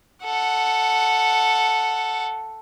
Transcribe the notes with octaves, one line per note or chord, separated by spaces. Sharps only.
A4 F#5